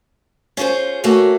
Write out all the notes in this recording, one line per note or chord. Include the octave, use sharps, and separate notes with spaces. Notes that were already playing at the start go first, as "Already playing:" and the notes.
C#4 F4 F#4 G#4 C5
A3 A#3 C#4 F#4